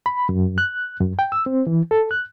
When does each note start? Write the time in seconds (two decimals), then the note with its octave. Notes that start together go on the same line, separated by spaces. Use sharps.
0.06 B5
0.29 F#2
0.58 F#6
1.00 F#2
1.19 G5
1.32 E6
1.46 C4
1.67 E3
1.91 A4
2.11 F#6